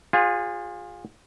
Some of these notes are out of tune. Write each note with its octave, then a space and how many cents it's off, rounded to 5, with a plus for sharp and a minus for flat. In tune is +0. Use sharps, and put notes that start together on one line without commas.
F4 +20 G#4 -25 C5 +0